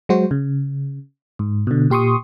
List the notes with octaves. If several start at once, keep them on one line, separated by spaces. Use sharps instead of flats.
F#3 G#3 F#4 C5
C#3
G#2
B2 D3
A#2 G4 C6 C#6 D#6